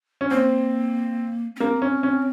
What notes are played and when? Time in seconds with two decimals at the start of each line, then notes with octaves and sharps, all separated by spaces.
0.21 C#4
0.31 A#3 C4
1.56 C#4
1.60 A#3 C4
1.82 C#4
2.03 C#4